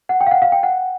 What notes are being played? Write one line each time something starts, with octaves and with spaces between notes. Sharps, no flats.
F#5
G5
F5
F#5
F5
G5
F#5